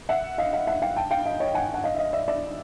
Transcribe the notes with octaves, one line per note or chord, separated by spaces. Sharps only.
E5 F#5
D#5 F5
D#5 F5
E5 F#5
F5 G5
G5 A5
F5 G5
D#5 F5
C#5 D#5
F#5 G#5
F#5
D#5 F5
E5
D#5 F5
D5 E5
D5 E5